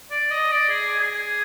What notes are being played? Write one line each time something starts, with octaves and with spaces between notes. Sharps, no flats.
D5
D#5
D5
G#4
G#4